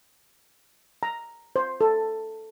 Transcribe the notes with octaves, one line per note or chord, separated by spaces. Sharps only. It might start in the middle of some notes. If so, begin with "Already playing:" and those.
A#5
C5
A4